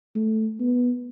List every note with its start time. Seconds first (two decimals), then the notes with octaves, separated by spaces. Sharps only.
0.15 A3
0.60 B3